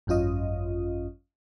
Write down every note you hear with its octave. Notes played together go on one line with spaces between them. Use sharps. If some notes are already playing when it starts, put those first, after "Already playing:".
G#1 F#2 C#4 F4 D#5